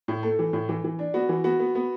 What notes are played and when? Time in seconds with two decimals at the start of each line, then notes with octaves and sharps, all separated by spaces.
0.08 A2
0.23 A3 A4
0.39 E3
0.53 A2
0.69 E3
0.84 E3
0.99 D4
1.14 B3 F#4
1.29 E3
1.44 B3 F#4
1.59 B3
1.75 B3